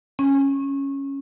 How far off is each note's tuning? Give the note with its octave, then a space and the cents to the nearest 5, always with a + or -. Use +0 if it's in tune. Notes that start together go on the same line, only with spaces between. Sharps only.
C#4 -5